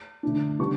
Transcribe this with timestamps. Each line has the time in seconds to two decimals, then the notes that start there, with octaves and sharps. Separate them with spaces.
0.23 D3 A3 D4
0.59 C#3 G3 B3 D4 C#6